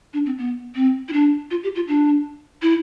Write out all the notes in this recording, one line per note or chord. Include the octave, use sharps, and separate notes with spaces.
D4
C4
B3
C4
E4
D4
F4
G4
F4
D4
E4